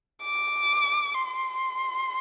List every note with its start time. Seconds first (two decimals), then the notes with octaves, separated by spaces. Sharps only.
0.24 D6
1.14 C6